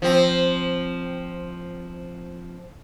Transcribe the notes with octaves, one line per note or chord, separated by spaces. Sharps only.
F3 C4